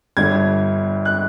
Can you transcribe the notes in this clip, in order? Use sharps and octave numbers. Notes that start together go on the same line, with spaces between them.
G1 G2 D3 G#6
F#6